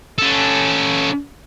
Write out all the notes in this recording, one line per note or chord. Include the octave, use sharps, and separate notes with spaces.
C#4 A4